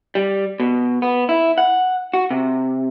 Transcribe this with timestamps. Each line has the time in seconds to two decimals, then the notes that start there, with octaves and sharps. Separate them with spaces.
0.15 G3
0.60 B2
1.02 B3
1.29 E4
1.58 F#5
2.14 F#4
2.30 C3